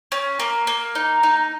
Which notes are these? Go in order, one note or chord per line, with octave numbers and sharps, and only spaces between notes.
C#4
A#3
A#3
D#4
D#4